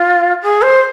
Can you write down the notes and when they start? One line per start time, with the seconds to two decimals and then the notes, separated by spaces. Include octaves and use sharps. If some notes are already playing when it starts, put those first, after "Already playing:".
Already playing: F4
0.42 G#4
0.61 C5